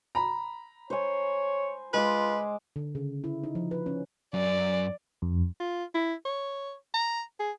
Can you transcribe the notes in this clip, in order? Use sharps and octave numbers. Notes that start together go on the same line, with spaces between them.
A#5 B5
C5 C#5 G#5
G#3 F4 B4 D6
D3
C#3
E4
D#4
F3
B4
C#4
F#2 D5
F2
F4
E4
C#5
A#5
G#4